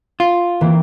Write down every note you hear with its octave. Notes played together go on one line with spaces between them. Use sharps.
F4
E3 A#3 C4